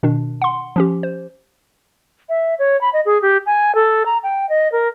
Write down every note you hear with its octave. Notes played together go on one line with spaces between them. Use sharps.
B2 D#3 D4
F#5 C6
F3 C#4 G4
C5
E5
C#5
B5
D#5
G#4
G4
G#5
A4
A#5
G5
D#5
A#4